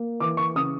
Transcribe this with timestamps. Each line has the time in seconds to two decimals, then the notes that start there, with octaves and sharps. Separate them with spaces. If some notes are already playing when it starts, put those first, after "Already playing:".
Already playing: A#3
0.20 E3 D6
0.37 C#6
0.55 C#3 D#6